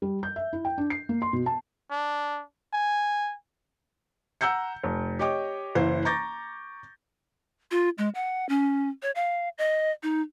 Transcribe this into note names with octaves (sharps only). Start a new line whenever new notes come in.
G3
G6
E5
E4
G5
D4
C7
A#3
C6
B2
A5
D4
G#5
F#5 A#5 E6 G6 C#7
F1
G4 C#5 D#5 G5 D6
F#1 E3 C5
A#5 C#6 D6 G6 A6 A#6
F4
G#3
F#5
C#4
C#5
F5
D#5
D#4